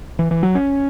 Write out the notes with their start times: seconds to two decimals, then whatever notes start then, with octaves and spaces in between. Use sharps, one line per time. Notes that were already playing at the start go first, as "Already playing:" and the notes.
0.19 E3
0.31 E3
0.43 F#3
0.55 C#4